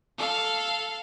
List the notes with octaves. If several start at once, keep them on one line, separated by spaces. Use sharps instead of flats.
A4 F5